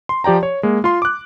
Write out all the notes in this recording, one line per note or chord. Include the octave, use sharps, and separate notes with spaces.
C6
F3 G4 D5 G5 A#5
C#5
G#3 A#3
F4 C6
D6 F#6